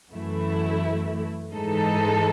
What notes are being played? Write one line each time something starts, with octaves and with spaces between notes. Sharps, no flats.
F#2 E3 A3 E4
G#2 E3 G#3 D#4 A4